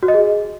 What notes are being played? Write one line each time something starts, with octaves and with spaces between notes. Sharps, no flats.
F#4
D#5
G#4